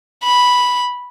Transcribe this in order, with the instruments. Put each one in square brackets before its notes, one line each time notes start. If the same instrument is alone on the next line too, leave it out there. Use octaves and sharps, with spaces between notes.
[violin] B5